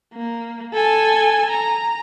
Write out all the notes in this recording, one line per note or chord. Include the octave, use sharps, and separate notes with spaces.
A#3
A4 G#5
A#5